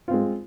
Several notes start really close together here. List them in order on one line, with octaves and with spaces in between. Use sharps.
F4 C4 G#3